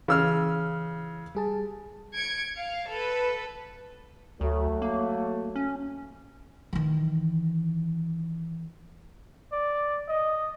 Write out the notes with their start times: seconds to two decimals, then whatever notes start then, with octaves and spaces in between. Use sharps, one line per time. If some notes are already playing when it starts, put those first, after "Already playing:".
0.08 C#3 E3 E6 F6
1.35 G3 G#4 A5
2.15 G#6 C#7 D7
2.57 F5
2.89 A4 B4
4.41 D2 F#3 A3
4.82 A#3
5.56 C#4
6.73 D#3 E3
9.52 D5
10.08 D#5